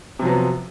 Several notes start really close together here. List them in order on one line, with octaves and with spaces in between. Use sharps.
C3 F3 F#3 B3